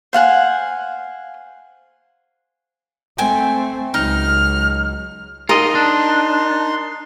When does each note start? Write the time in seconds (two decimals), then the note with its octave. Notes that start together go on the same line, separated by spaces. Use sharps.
0.13 C5 F5 F#5 G#5
3.18 A3 C4 G5 G#5
3.94 C#2 F#3 D#4 F6
5.49 D#4 F4 A#4 D#5 C6
5.75 D4